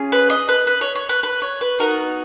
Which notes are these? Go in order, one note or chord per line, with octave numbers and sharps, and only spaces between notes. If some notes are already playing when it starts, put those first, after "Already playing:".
Already playing: C#4 F4 G#4
B4
D#5
B4
B4
C#5
C#5
B4
B4
C#5
B4
B3 D#4 F#4 A#4